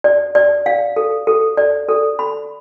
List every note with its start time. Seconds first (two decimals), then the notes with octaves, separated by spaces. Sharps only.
0.04 D5
0.35 D5
0.66 F5
0.96 A4
1.27 A4
1.57 D5
1.89 A4
2.19 B5